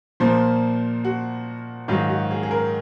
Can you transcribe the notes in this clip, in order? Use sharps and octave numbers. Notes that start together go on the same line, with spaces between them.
A#2 F3 A#3 C5
F#4
G#2 D#3 F#3 F4
F#4
G#4
G#4
A#4